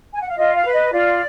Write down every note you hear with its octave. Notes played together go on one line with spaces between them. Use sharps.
G#5
F#5
F5
F4 D#5
F5
B4
D#5
F4 D5